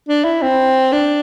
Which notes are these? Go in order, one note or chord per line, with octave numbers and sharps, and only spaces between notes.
D4
E4
C4
D4